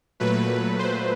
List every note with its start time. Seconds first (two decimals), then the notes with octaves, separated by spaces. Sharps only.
0.20 A#2 F#3 A3 B4
0.79 C5